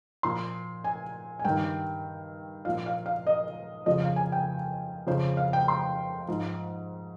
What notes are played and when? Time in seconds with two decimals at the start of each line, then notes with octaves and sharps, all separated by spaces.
0.23 A#2 F3 C6
0.84 G#5
1.39 G#5
1.45 G2 D#3 G5
2.65 A#2 F3 F5
2.86 F5
3.06 F5
3.27 D#5
3.86 F2 C#3 F3 D#5
4.02 F5
4.16 G#5
4.32 G5
5.07 F2 C#3 F3 C5
5.37 F5
5.53 G5
5.68 C6
6.28 G#2 F3